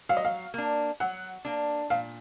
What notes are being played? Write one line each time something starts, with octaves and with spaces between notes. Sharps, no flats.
F#3 F5
D#5
F5
A#3 D4
F#3 F#5
A#3 D4
A#2 F5